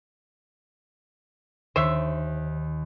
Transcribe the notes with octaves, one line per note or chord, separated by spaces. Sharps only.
D#2 C5 C#5 E5